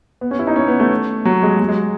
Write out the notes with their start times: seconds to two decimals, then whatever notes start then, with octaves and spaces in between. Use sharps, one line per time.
0.21 B3
0.31 C#4
0.39 E4
0.47 D#4
0.56 C#4
0.68 B3
0.80 A3
1.25 F#3
1.43 G#3
1.60 F#3
1.69 G#3